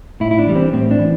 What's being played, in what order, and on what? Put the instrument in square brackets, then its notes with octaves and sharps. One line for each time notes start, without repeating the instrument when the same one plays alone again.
[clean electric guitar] A2 E4
E4
D4
E3 G3
C4
A2 C4
D4
E3